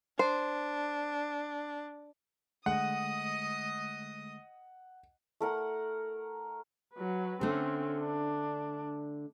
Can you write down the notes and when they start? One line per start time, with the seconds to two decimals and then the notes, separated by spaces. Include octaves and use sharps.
0.19 D4 C5
2.66 D3 G#3 A3 D#5 F#5 D#6
5.40 A3 A#4 F#5
6.94 F#3 B4
7.41 D3 A3 C4 C#4
8.00 D4